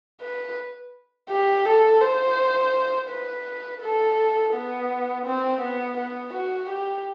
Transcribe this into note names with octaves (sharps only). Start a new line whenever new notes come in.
B4
G4
A4
C5
B4
A4
B3
C4
B3
B3
F#4
G4